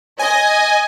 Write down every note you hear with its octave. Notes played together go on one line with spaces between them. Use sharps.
D#5 G#5